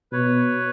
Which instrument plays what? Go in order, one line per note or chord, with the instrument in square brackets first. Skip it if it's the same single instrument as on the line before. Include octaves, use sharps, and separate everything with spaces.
[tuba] B2 [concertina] B4 C#5